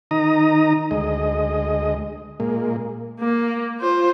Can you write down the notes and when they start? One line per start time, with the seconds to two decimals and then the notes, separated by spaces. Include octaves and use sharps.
0.11 D#3 D#4 A#5 D#6
0.91 D2 G#3 D#5
2.40 A#2 G#3 A#3
3.20 A#3
3.80 F4 C5